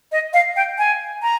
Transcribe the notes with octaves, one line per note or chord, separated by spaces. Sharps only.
D#5
F5
G5
G#5
A#5